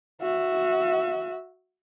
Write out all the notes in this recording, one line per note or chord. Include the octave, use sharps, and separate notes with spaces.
F#4 E5